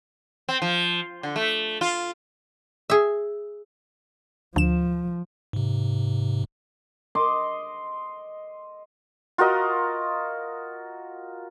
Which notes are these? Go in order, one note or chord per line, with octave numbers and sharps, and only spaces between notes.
C4
F3
D3
A3
F4
G#4 E5
D2 F3 E7
G#2 C3
D#5 C6 D6
F4 F#4 A#4 D#5